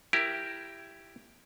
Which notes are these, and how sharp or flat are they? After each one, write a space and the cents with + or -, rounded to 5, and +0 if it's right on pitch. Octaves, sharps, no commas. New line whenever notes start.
E4 +10 G4 +0 A#4 +0